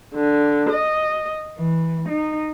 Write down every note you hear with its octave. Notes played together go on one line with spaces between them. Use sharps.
D3
D#5
E3
D#4